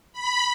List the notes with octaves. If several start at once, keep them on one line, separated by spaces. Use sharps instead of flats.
B5